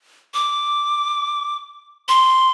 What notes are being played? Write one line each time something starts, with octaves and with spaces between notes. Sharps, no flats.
D6
C6